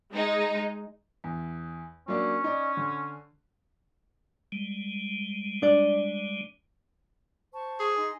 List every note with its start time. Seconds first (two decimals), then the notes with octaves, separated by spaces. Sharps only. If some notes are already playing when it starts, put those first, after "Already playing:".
0.13 G#3 D#4
1.24 E2
2.08 F#3 A#3 C#4 D4
2.44 D#4 D5
2.77 D3
4.52 G3 G#3
5.62 D4 D5
7.53 C5 A5 C#6
7.80 G#4
7.96 D#4 G#5 C6